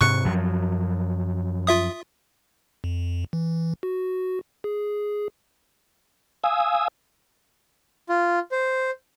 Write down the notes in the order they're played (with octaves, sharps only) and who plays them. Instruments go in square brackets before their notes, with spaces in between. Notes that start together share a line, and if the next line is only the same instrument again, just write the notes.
[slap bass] G#2 C3 [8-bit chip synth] C#6 F#6 C#7
[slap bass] F#2 F3 F#3
[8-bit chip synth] F4 E5 D#6
F2
E3
F#4
G#4
[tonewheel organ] F5 G#5 D#6 E6 G#6
[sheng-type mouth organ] F4
C5